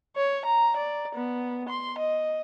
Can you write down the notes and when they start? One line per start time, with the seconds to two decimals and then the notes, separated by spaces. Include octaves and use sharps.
0.16 C#5
0.46 A#5
0.77 D5
1.15 B3
1.69 C6
1.99 D#5